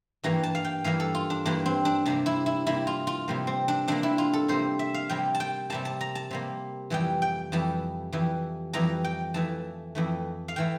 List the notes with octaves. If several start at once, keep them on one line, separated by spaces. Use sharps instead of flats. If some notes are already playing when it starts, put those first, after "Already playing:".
G2 E3 G3 A#3 A#5
A5
F5
G5
G2 E3 G3 A#3 F5
A4
F4
D4
G2 E3 G3 A#3 D4
C4
D4
C3 G3 A#3 D4
E4
E4
C3 G3 A#3 E4
F4
F4
C3 G3 A#3
C4
D4
C3 G3 A#3 D4
E4
F4
A4
C3 G3 A#3 C5
E5
F5
C3 G3 A#3 G5
A5
G5
C3 G3 A#3 A5
A5
A#5
A5
C3 G3 A#3
F2 E3 G3 G5
G5
F2 E3 G3 A5
F2 E3 G3
F2 E3 G3 A#5
G5
F2 E3 A3 A5
F2 E3 A3
F5
E3 A3 G5